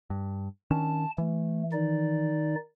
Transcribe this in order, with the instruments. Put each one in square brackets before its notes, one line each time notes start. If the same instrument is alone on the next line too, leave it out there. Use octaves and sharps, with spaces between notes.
[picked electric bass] G2
[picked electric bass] D#3 C#4 D4 [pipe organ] A5
[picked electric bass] E3 [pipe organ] A3
[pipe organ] D#3 D#4 D5